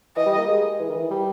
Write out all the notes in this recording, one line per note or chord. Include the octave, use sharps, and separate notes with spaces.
E3 D#5
G3
A#3
G#3
E3
D#3
E3
G3